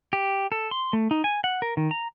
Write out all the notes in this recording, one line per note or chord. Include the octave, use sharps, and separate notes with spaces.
G4
A4
C6
A3
D#4
G#5
F#5
A#4
D#3
A#5